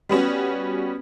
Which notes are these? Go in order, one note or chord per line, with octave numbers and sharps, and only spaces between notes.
G3 B3 C#4 F#4